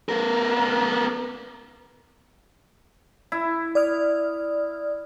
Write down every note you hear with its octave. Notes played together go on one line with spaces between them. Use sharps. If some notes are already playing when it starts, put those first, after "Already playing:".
B3 A#4
E4
D5 D#6 F6